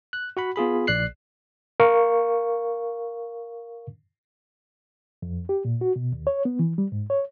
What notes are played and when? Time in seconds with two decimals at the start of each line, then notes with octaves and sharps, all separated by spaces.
0.13 F#6
0.37 F#4 F#5 B5
0.56 B3 F4 G#4 B5
0.87 A#1 D5 F#6 C7
1.80 A#4 F5 C#6
5.22 F2
5.49 G4
5.65 A#2
5.81 F#4
5.96 B2
6.12 D#2
6.27 C#5
6.45 B3
6.59 E3
6.78 G3
6.92 G#2
7.10 C#5